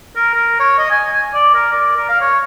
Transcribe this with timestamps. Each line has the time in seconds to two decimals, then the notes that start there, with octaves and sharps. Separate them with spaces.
0.15 A#4
0.33 A#4
0.60 C#5
0.78 D#5
0.90 G#5
1.10 G#5
1.34 D5
1.55 A#4
1.72 D5
1.96 A#4
2.09 F5
2.21 C#5